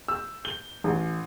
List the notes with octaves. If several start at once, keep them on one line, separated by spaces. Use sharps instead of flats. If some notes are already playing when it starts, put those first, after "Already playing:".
E6
G7
A1